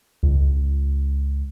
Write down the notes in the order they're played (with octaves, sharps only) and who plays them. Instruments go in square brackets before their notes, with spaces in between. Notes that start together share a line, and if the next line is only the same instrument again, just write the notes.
[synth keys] C#2